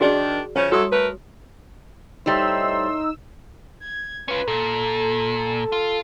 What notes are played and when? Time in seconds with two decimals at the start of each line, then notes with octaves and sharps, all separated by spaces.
0.01 D#3 D4 F#4 G#4 D5
0.56 C#3 F3 C#4 C#5
0.72 F#3 E4 F#4 A4 D#6
0.91 A3 A#4 B4
2.26 A2 G3 D#4 C5 E5 C6 E6
3.80 G#6
4.28 C#4 F4 B4
4.48 A#2 A4
5.72 F4